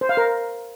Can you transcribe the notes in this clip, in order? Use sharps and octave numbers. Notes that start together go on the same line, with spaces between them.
C5
F5
A#4